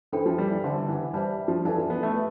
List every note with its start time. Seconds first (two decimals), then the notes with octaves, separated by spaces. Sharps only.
0.12 E3 D4 A4 C5 G5 B5
0.26 F3
0.38 G3
0.51 E3
0.64 D3 C5 E5 A5
0.89 E3
1.14 G3 C5 E5 A5
1.48 F3
1.65 E3 A4 D5 F5 A5
1.78 F3
1.90 B3
2.03 A3